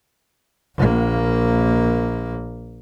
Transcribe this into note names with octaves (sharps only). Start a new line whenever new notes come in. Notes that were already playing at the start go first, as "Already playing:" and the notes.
A#1 A#3